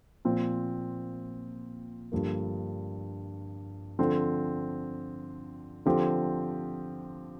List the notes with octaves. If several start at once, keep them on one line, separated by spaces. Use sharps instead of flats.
A#2 F3 C4
G2 D3 F3 A#3
D3 F3 C4
D3 F3 C4 G4